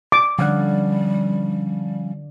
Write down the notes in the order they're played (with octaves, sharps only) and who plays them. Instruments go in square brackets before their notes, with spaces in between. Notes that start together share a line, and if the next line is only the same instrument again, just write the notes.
[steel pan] D6
[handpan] D3 D5 [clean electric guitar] F3 C#4 F#5 [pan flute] G3